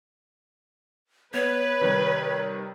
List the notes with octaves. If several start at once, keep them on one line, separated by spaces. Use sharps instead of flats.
B3 B4 C#5
C3 D#3 G3